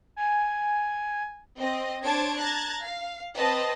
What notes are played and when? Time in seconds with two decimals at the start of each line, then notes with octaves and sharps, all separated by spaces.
0.16 G#5
1.60 C4 D#5
2.04 D4 C5 C#5 A5 G#6 D7
2.40 A5 A#5 F#6 G#6 A6
2.83 F5
3.36 C4 B4 D#5 A5